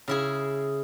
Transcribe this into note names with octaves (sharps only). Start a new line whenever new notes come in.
C#3 E4 G#4